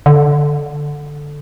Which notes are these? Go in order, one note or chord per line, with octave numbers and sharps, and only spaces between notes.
D3